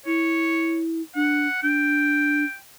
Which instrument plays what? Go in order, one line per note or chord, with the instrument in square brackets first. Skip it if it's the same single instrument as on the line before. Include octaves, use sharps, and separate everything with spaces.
[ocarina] E4 [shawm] C#5
[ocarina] D4 [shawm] F#5
[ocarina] D4 [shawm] G5